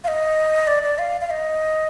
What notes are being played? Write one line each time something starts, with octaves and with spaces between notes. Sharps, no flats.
F5
D#5
D5
D5
F5
F5
D#5